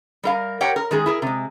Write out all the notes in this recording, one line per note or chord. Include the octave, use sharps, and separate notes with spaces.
G3 A#4 F5
G4 A#4 C#5 F#5 G5
A#4
D#3 G#3 G#4
E4 G#4 A#4
C3 G#3